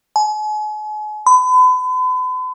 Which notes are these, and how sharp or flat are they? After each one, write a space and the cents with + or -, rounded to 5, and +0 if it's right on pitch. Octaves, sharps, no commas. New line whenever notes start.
G#5 +40
B5 +40